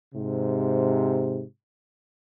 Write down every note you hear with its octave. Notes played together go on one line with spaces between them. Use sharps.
G#2 C3